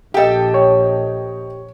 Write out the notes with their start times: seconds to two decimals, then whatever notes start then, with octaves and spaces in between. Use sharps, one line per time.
0.14 A#1 G4 A4 D#5 G5
0.54 C#5